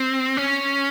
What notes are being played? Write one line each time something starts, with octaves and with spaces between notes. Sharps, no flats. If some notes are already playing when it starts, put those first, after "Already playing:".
Already playing: C4
C#4